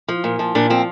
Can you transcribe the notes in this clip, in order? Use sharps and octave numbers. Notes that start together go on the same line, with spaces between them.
F3
A#2
F3
A#2 D4
F3 C4